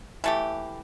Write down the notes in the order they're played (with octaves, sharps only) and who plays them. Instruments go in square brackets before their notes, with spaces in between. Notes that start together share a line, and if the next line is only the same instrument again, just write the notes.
[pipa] E3 A3 G4